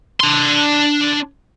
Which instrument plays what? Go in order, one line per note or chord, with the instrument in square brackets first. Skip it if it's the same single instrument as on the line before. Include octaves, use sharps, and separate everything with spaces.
[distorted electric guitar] D4 C6